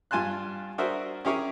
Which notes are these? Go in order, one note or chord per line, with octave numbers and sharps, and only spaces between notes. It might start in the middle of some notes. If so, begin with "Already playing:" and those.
G2 F4 G#5 A5 C6 F#6
D4 F#4 G#4 A#4 C5 E5
C#4 E4 G4 G#4 A#4 C#5